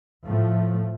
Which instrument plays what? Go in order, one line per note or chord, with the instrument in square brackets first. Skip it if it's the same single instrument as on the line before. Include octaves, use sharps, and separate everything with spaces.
[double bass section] A2 F3 A3